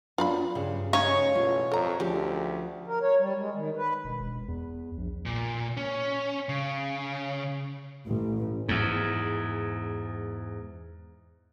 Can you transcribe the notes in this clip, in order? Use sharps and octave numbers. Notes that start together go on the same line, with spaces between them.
F#3 B3 D4 F4 F5 B5
G2 C#3
G#3 C#4 D#4 C#5 F5
A1 B2 F4
F2 A4 A#5
D2 C#3 F3 F4 G4
A#4
C#5
G3
G#3
D#3
B4
E1
E1
E2
A#1
A#2
C#4
C#3
A1
E2 G#2